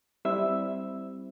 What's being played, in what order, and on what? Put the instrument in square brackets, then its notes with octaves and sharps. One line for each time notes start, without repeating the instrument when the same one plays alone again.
[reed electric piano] G3 C4 E4 [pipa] E5